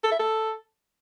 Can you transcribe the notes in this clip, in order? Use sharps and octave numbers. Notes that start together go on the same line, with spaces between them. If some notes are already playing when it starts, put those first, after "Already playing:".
A4
E5
A4